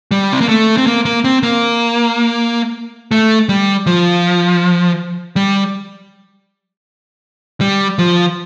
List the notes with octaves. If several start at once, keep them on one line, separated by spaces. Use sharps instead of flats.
G3
C4
A#3
A3
C4
A#3
A#3
C4
A#3
A3
G3
F3
G3
G3
F3